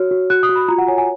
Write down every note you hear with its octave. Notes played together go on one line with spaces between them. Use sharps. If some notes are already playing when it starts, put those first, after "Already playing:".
Already playing: F#4 C#5 F6
F#4
F#4 F#6
D#6
F#4
B5
F4 A#5
F#5
C#5 G#5
G#5